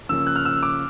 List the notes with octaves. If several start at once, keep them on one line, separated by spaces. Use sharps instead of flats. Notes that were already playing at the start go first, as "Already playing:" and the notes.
C#3 F3 A#3 C#4 E6
F#6
F6
E6
D6